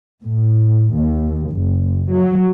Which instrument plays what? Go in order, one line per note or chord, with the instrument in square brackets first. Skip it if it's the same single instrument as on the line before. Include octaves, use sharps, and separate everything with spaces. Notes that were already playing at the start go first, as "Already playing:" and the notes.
[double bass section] A2
D#2
F#1
F#3